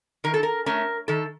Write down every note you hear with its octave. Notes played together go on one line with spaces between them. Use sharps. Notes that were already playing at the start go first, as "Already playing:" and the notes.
D#3 A#4
A4
A#4
A3 C#4 A#4
D#3 A4